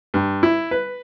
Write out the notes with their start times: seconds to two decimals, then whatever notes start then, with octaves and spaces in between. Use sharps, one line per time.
0.14 G2
0.43 E4
0.71 B4